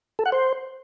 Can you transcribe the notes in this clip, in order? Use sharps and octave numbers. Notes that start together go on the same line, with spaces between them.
A4
F#5
C5